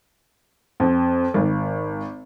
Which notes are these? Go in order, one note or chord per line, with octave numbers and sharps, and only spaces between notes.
F2
G#1